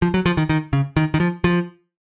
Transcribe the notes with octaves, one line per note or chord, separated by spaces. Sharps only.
F3
F#3
F3
D#3
D#3
C#3
D#3
D#3
F3
F3